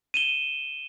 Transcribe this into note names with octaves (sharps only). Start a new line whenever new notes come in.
D#7 E7 G7